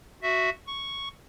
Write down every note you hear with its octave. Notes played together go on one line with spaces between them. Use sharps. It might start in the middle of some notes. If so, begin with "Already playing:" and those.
F#4 E5
C#6